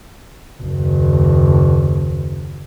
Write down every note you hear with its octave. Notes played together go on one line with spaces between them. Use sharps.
F#1 D#2